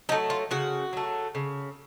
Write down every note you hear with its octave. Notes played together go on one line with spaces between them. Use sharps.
F#3 A3 D#4
F4
C#3 F#4
F#3 A3
C#3